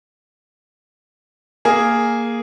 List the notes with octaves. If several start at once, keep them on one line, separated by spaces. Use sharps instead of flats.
A#3 G#4